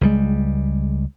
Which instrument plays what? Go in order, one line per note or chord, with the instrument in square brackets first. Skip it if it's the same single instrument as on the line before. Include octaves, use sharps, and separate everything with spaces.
[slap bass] C#2 G3 G#3